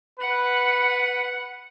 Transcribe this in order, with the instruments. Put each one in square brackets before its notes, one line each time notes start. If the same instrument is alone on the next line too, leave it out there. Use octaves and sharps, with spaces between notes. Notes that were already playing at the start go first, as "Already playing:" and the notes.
[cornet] B4 [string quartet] F#5